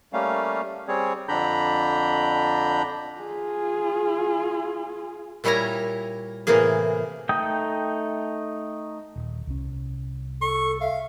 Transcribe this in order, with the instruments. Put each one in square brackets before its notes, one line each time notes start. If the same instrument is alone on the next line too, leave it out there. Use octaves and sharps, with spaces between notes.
[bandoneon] G3 A3 A#3 C#4 F5
G3 C4 G#4 C#5
F2 D3 D4 A#5 B5 G6
[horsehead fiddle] F4 G#4
[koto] A#2 G3 E4 C#5 G#5 A#5
A2 C3 E3 A#3 G#4
[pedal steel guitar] A3 D#4 G5 D#6 G6
[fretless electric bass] D#1
C2 C#4
[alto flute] A4 [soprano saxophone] C#6
[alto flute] E5 [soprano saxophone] F5